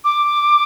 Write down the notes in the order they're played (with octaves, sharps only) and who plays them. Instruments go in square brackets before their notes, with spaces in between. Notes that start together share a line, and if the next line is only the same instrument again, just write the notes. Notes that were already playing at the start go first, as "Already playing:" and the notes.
[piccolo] D6